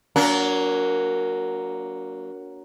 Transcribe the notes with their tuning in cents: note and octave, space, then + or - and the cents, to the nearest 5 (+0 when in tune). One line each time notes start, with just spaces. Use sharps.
F#3 +0 A#3 +0 D4 -40